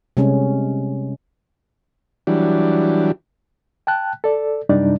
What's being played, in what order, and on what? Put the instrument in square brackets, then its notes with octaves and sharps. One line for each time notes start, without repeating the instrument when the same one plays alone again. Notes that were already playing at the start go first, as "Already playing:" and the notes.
[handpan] C3 G3 G#3 C#4
[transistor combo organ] E3 F#3 G3 D4
[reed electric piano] G5 A5 F#6
A4 D5
F#2 C3 G3 D4 D#4 D5